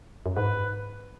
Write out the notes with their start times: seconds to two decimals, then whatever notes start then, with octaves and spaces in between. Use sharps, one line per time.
0.26 F#2
0.36 G#2 B4